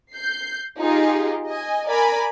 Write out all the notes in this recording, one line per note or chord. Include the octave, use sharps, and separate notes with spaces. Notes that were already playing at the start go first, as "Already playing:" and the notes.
G6 C7
D#4 F4 G4 G#4
D#5 G#5
A#4 D5 G#5 A#5 B5